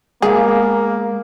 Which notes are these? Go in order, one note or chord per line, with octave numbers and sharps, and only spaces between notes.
G#3 A#3 B3 G#4 F5